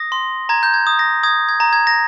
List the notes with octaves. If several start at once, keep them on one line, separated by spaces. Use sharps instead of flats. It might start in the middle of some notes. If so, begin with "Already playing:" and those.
Already playing: D#6 A#6
C6
A#5 G#6
G6
G#6
D#6
A#6
D#6 G#6
G#6
A#5
G#6
A#6